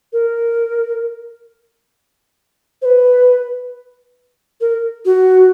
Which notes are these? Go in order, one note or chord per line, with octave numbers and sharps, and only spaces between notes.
A#4
C5
B4
A#4
F#4